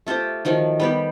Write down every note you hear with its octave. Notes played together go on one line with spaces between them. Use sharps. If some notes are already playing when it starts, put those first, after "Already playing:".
A3 F4 G4 C5
D#3 F3 F#3
G3 B3 G4